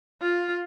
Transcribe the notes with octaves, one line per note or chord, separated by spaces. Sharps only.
F4